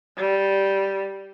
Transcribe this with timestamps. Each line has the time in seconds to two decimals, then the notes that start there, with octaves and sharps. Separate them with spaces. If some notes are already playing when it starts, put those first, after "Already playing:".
0.17 G3